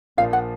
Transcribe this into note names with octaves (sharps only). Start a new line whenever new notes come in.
A#1 A#2 F3 F5
F#5